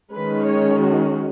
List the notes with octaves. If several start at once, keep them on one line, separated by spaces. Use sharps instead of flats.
D#3 G#3 C#4 B4
C#5
F#4